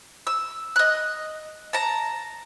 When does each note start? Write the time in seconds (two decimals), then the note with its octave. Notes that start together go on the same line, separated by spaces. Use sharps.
0.27 E6
0.76 D#5 F#6
1.73 A5 A#5